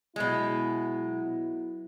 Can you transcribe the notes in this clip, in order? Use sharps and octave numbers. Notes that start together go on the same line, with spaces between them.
B2 F#3 G#3 B3 E4